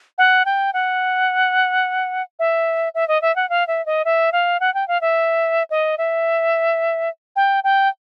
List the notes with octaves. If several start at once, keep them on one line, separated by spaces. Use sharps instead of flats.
F#5
G5
F#5
E5
E5
D#5
E5
F#5
F5
E5
D#5
E5
F5
F#5
G5
F5
E5
D#5
E5
G5
G5